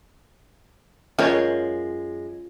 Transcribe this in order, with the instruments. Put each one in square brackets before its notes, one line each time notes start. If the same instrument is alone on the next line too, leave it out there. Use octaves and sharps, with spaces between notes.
[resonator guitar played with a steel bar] F#2 G#3 [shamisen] C#4 A#4 C#5 [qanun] F4